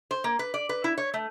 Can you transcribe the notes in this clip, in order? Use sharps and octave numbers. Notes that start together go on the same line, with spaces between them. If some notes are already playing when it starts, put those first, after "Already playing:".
C5
A#3
B4
D5
B4
E4
C#5
A3